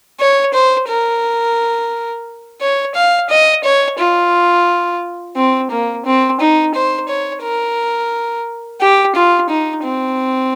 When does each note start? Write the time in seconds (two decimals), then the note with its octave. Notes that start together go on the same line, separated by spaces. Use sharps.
0.20 C#5
0.54 C5
0.89 A#4
2.61 C#5
2.95 F5
3.30 D#5
3.64 C#5
3.99 F4
5.36 C4
5.71 A#3
6.06 C4
6.40 D#4
6.75 C5
7.09 C#5
7.42 A#4
8.81 G4
9.16 F4
9.50 D#4
9.84 C4